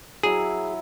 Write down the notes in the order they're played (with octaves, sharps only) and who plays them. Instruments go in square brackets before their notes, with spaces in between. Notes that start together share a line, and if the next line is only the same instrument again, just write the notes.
[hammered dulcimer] F#3 E4 E5 [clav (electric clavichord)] G#4